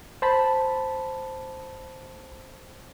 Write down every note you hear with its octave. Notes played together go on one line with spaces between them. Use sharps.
C5 A5 B5